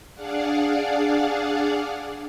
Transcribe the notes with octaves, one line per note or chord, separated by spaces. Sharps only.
D4 G#4 D5 F5 F#5